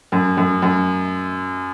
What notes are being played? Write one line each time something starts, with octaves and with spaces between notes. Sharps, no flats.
F#2
F#2
F#2